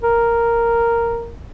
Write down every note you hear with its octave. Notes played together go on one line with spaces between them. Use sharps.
A#4